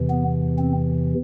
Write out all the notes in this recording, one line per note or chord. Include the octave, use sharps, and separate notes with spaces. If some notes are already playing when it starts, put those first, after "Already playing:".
Already playing: E2 C3 E3
B3
C4